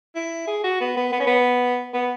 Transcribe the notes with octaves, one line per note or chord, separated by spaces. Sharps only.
E4
G#4
F#4
B3
B3
B3
C#4
B3
B3